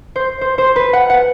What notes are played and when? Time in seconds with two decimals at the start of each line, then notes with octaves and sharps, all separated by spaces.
0.16 C5
0.41 C5
0.58 C5
0.76 B4
0.93 F#5
1.10 F#5